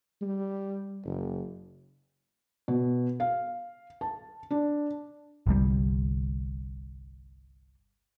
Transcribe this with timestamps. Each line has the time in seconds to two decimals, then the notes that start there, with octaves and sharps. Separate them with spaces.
0.22 G3
1.05 F#1
2.68 B2
3.20 F5
4.01 A5
4.51 D4
5.47 G1 C2 G3